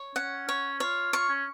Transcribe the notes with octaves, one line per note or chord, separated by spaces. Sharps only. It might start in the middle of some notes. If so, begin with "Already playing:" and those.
Already playing: C#5
C#4 F#5
C#4 C#5
F4 C#5
F4 C#6
C#4